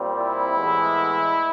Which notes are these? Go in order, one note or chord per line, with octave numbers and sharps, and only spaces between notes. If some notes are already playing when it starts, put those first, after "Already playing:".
Already playing: A#2 G3 C4
E4
A2 E3 G#3 B3